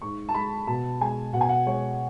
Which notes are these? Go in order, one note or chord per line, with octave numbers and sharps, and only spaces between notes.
G#2 C#6
A5
G#3 B5
B2 A5
G#3 G#5
B2 F#5
G#5
F#5
G#3 C#5